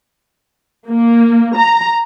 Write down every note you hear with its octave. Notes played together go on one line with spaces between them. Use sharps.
A#3
A#5